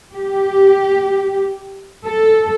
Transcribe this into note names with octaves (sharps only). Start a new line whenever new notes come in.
G4
A4